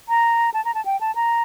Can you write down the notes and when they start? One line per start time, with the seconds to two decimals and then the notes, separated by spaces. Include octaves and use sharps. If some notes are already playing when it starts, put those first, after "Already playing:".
0.09 A#5
0.54 A5
0.65 A#5
0.75 A5
0.85 G5
1.01 A5
1.15 A#5